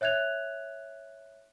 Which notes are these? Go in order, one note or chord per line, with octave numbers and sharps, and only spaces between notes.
C#5 E5 F#6 G#6 F7